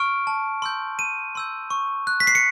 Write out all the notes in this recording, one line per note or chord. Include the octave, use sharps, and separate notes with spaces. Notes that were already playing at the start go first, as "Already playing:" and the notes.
Already playing: C#6 F6 D7
A5
C6 E6 G6
A5 D#7
C6 E6 G6
C#6
F#6
B6
C7
C#7